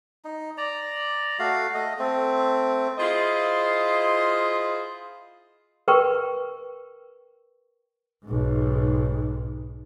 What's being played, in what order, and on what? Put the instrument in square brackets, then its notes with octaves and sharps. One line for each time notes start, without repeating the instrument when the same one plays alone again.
[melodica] D#4
D5 A#5
A3 F#4 F5
A3 D#5
A3 C4
[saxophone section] E4 F4 G#4 C5 D#5 F5
[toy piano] A#4 B4 G5 C#6
[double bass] B1 G#2